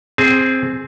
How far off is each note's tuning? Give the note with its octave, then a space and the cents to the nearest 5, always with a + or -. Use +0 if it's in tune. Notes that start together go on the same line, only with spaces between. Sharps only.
C4 +5 G#4 -5 G#5 +45